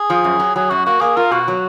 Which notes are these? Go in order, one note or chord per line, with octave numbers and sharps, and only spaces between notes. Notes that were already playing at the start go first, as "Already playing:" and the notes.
Already playing: G#4
F3
F#2
F#3
F#3 G#4
F#2 F#4
A#3 F#4
A#3 G#4
F4 A#4
B2 F#4
F#3